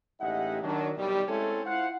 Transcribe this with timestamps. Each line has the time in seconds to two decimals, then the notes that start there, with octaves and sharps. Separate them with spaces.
0.20 A1 G#3 D#4 G4 E5 F#5
0.62 D#3 F#3 D4
0.96 B1 C3 D#3 G3
1.28 G#3 A3 C4 C#4 E4 A4
1.65 E4 F4 C5 F5 F#5